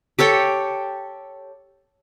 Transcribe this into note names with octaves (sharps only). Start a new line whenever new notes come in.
G4 A4 C#5 G5